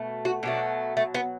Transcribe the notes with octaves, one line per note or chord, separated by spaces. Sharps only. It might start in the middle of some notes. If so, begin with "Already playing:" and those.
Already playing: B2 A3
F#4
B2 F#3 A3 D4
A3
B3